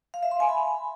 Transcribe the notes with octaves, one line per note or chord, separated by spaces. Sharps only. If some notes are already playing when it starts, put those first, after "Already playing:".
F5
E5
C6
G#5
B5